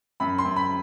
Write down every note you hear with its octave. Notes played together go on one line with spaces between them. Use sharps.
F#2 B5
C6
F#2
B5